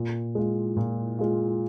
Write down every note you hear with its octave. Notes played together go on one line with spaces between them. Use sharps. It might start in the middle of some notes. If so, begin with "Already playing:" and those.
Already playing: A#2
G#3 F4
A#2
G#3 F4